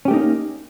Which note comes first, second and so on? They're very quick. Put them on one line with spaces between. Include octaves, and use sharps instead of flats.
C#4 G4 A3 D#4 A#3